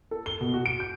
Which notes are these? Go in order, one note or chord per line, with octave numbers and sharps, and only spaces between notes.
A4
G7
B2
F#4
D7
G6